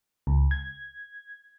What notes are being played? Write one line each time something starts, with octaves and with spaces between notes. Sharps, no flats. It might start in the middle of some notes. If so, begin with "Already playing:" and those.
C#2
G#6